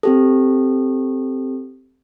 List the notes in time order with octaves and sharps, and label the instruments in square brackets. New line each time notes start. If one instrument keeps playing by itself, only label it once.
[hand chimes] C4 G4 A4